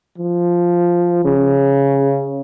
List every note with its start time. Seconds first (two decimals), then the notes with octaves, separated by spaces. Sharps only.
0.18 F3
1.25 C#3